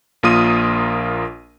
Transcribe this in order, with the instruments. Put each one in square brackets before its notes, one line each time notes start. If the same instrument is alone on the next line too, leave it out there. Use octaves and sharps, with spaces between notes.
[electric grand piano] A#1 A#3 F4 A#4 D#6 D#7